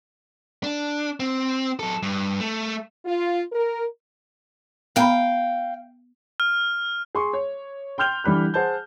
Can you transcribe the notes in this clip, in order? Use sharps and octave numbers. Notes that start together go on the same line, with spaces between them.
D4
C4
F#3 A4
G2
A3
F4
A#4
B3 F5 G5 A#5 B5
F6
G#4 C6 C#6
C#5
G5 C6 F6 G6 F7 G7
D3 E3 G3 B5 F#6
G#4 C5 F#5 A5 G6